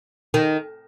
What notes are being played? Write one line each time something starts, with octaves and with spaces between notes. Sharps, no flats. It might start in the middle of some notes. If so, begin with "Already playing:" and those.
D#3